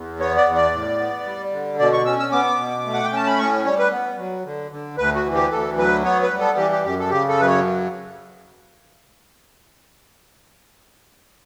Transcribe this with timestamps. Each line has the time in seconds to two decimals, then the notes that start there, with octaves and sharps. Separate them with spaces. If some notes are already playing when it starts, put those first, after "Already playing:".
Already playing: E2
0.19 B3 C#5
0.37 D5
0.46 E2
0.55 D5
0.73 A2
1.00 B3
1.26 G3
1.52 D3
1.79 B2 D5
1.93 C#6
2.05 C#4 E6
2.20 E6
2.32 B3 D6
2.59 B2
2.86 A3
2.94 F#5
3.04 G5
3.12 C#4 A5
3.27 B5
3.38 A2 C#6
3.65 G3 C#5
3.79 B4
3.92 B3
4.18 F#3
4.45 D3
4.71 D3
4.98 D2 B4
5.15 F#4
5.25 E3
5.34 G4
5.51 D2 A4
5.78 F#3 B4
6.04 B3 C#5
6.23 B4
6.32 G3
6.40 A4
6.57 E3 G4
6.72 G4
6.85 F#2 G4
7.00 A4
7.10 C#3 G4
7.29 A4
7.38 F#2 B4
7.47 C#5